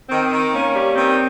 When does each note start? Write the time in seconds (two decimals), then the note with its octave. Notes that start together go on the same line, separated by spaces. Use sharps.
0.09 D#3 C4
0.31 D#3
0.53 A#3 C#4
0.74 G3
0.96 D#3 C4